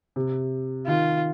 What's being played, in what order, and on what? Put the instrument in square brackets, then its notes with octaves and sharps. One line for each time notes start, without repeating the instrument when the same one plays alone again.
[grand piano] C3
[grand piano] D#3 [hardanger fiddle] F4